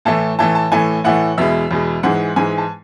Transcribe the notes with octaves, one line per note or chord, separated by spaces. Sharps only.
A2 E3 A3 A5
A2 E3 A3 A5
A5
A2 E3 A3 G#5
A2 E3 A3 F#5
E2 B2 G#3 E5
E2 B2 G#3
G#2 E3 G#3 F#5
G#2 E3 G#3 G#5
A5